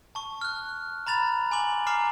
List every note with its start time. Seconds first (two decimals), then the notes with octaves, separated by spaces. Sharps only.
0.15 A5 C#6
0.41 F6 F#6
1.07 A#5 B5 A6 F7
1.51 G#5 C6 D6 F#7
1.87 A#5 D6 F6 C7